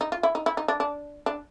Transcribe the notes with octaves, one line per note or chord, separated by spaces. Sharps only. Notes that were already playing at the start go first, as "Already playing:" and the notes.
D#4
F4
E4
D#4
E4
D#4
D4
D4
D4